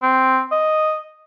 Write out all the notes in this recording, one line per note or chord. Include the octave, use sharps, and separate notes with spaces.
C4
D#5